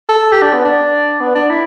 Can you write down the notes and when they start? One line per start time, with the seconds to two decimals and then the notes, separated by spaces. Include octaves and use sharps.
0.09 A4
0.32 G4
0.42 D4
0.53 B3
0.65 D4
1.20 B3
1.35 D4
1.50 E4